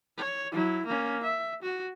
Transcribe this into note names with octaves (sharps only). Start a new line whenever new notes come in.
C#5
F#3 E4
A#3 C#4
E5
F#4